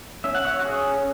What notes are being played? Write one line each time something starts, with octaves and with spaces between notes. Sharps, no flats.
C#4 E5
F#5
C#5 E5
F#4
C#4 G#4